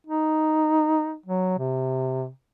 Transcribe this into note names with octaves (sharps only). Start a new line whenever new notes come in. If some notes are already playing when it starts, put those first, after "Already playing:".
D#4
F#3
C3